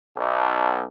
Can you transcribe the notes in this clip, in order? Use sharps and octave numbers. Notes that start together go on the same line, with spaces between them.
B1